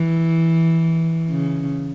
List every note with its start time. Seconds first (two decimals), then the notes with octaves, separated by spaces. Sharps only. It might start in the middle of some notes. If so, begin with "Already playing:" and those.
Already playing: E3
1.30 C#3